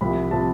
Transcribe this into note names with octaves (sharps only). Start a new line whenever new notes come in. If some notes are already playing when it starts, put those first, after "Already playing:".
C2 C3 F3 B5
C3 F3 A5